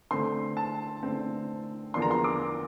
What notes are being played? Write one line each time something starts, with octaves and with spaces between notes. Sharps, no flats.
D3 A3 C4 C6
A5
D3 A3 C4
E2 D3 F3 A#3 D4 C6
A#5
C6
D6